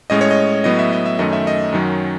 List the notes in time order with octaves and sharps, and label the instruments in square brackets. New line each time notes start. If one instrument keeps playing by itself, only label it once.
[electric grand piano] A2 G#3 C#4 D#5
C#5
D#5
A2 F#3 B3 D#5
E5
D#5
E5
F#2 D#3 A3 C#4 D#5
E5
D#5
F#2 D#3 F#3 C#4